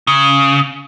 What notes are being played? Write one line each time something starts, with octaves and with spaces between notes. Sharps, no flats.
C#3